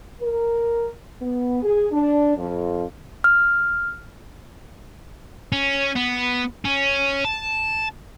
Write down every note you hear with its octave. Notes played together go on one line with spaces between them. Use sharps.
A#4
B3
G#4
D4
F2
F6
C#4
B3
C#4
A5